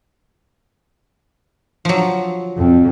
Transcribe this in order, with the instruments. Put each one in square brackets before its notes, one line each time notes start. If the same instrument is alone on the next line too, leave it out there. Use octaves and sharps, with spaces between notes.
[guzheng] F3 F#3
[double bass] F2